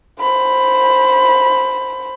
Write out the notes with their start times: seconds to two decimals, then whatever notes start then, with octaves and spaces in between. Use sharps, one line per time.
0.21 C5 B5